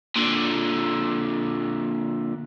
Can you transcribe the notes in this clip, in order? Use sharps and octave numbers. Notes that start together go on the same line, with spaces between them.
A#2 D3